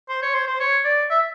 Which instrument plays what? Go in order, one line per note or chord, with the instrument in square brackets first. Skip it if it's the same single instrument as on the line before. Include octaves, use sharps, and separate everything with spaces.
[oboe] C5
C#5
C5
C5
C#5
D5
E5